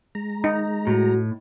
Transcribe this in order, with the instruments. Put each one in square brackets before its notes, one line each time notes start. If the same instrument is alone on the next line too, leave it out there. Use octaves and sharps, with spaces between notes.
[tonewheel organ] G#3 A#5
[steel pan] D#4
[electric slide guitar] A2 [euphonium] F#4